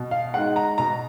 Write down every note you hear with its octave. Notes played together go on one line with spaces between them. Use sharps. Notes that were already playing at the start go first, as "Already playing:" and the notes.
Already playing: B2
F5
G#3 D#4 F#5
A#5
B2 A#5